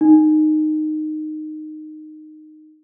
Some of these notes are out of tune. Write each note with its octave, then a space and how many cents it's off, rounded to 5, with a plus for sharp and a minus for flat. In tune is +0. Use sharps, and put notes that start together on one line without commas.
D#4 -15